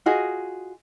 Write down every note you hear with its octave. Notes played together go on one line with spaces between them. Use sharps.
F4 F#4 G#4 D#5